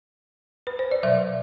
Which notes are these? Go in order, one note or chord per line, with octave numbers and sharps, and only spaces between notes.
B4
C5
D5
B2 F#3 E5